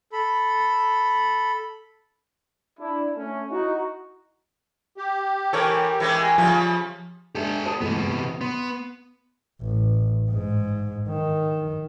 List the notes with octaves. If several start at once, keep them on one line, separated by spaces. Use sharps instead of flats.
A4 B5
D4 E4
A3 C#4
D#4 E4 F#4
G4
E3 A4 A#4 C#5
E3 G#3 C#4
C#3 F3 G3 A3
G#3 D4 G4 A4 E5
C5 A5 D#6
E2 C3 G#3 A3 B3
E2 G4
B3 C6
A1
G#2
D#3